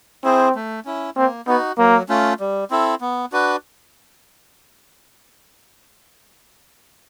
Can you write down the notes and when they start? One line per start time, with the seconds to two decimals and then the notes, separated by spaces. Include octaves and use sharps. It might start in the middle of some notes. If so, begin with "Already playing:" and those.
0.24 C4 E4 G#4 C5
0.55 A3
0.85 C#4 E4
1.17 A#3 C4
1.47 B3 D#4 F#4
1.78 F#3 A#3
2.09 A3 C#4 F4
2.40 G3
2.71 C4 E4 A4
3.01 B3
3.32 D4 F#4 B4